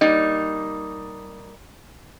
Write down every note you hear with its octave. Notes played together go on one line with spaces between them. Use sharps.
G3 A#3 D#4